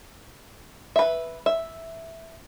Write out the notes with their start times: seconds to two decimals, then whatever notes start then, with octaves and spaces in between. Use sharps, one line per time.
0.96 B4 E5
1.46 E5